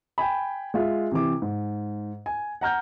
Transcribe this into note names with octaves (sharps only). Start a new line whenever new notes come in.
G5 G#5 B5
G#3 F4 E5
C3 E3 D6
G#2
G#5
F#5 A#5 F6 G6